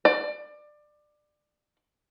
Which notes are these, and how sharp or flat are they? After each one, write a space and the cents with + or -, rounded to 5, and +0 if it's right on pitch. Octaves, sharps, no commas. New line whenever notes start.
D5 +20